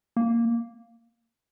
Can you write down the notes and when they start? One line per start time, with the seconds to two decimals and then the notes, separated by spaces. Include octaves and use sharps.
0.17 A#3